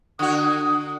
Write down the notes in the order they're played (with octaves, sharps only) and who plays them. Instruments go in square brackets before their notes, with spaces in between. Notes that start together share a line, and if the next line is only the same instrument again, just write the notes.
[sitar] D3 F#4 [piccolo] D#6